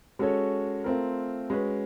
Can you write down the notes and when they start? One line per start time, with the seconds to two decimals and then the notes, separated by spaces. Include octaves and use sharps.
0.19 G#3 C#4 F#4 A4 C#5
0.84 A3 C4 F4 A#4
1.50 G#3 C#4 F#4 B4